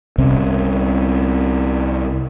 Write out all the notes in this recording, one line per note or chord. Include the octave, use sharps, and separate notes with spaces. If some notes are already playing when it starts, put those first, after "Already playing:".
C2 C3 C4 C#4